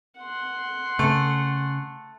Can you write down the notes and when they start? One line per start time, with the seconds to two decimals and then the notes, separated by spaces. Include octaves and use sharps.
0.19 F#5 C6
0.99 C#3 A3